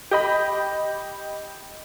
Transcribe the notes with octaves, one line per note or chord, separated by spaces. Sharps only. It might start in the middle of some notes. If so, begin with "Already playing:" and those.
G4 D#5 B5